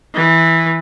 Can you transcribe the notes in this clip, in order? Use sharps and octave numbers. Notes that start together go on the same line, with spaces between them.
E3